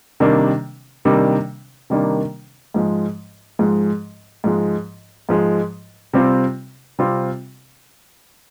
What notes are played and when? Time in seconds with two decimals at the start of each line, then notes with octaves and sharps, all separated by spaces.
0.20 C3 D#3 G3 A#3 D4
1.05 C3 D#3 G3 A#3 D4
1.90 C3 D#3 G3 A#3 D4
2.74 G#2 F3 G#3
3.59 G#2 F3 G#3
4.44 G#2 F3 G#3
5.29 G#2 F3 G#3
6.13 C3 G3 C4 F4
6.99 C3 G3 C4 F4